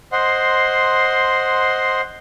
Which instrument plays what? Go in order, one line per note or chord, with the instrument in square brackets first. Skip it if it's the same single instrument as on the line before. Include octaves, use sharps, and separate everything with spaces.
[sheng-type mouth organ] C5 D#5 F#5 C6